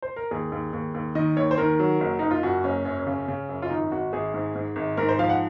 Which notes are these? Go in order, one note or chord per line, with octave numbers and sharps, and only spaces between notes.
C5
A#4
D#2 G#4
D#2
D#2
D#2
D#3 D#5
D#2 C#5
C5
D#3 A#4
F#3
F#1
F#1 D#4
F4
F#2 F#4
F#1 C#4
F#2 C#4
C#4
C#3
C#4
C#3
F#2
F4
G#1 D#4
G#1 F#4
G#1 G#4
G#2
G#2
G#1
G#2 A#4
C5
F3 F5
F#5